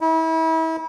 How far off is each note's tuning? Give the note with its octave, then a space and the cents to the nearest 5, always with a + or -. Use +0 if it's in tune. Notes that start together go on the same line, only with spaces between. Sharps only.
E4 -35